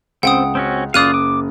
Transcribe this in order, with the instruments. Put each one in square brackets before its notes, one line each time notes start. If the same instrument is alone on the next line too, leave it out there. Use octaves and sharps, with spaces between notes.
[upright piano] C#2 [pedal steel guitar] C4 [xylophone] F#5 G5 D#6
[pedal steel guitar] C4 C#4 F#4
[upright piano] F#1 [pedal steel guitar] F4 D5 F5 [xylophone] D#6 F#6 D#7
[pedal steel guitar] D6